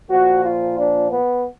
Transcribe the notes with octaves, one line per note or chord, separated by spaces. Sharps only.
A#2 F3 F#4
F4
D4
B3